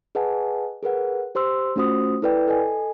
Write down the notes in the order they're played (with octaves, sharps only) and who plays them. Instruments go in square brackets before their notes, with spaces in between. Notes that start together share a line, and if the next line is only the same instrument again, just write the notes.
[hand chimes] G#4 B4 D#5 F#5 G#5 A5
G#4 A#4 B4 F#5
G4 C5 C6 E6
A3 C#4 F4 F#4 C5 D#6
E4 A4 B4 D5 G5
A4 D#5 G#5